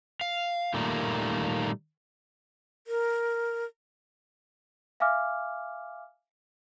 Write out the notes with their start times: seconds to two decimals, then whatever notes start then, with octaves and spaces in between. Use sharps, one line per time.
0.21 F5
0.74 A#2 D#3 G3 A3 A#3
2.87 A#4
5.00 E5 F5 G#5 D6 F6